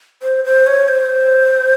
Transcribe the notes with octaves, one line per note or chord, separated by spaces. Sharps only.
C5
C5
C#5
C5